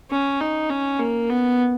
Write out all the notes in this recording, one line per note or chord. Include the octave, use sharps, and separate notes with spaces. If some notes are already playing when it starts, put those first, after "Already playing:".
C#4
D#4
C#4
A#3
B3